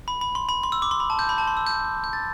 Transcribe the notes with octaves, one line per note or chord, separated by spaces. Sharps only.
B5
B5
C6
B5
C6
E6
D6
C6
B5
A5
G6
B5
A5
C6
E6
G6
G6
A6